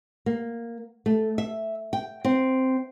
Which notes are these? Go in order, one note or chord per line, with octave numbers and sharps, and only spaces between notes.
A#3
A3
E5
G5
C4